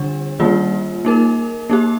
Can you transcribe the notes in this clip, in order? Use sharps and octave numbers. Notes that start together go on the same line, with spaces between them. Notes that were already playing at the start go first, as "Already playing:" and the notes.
Already playing: D3 G3 D4
D#3 G3 A#3 F4
A#3 D#4 A#4
A#3 D#4 G4